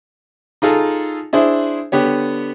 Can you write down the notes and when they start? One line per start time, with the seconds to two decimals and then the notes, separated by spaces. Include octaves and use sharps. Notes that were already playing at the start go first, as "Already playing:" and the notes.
0.62 D#4 F4 G#4 A4 A#5
1.33 D4 E4 G#4 C5
1.92 D3 B3 G4 C#5